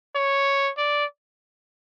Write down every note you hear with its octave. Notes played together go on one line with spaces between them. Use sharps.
C#5
D5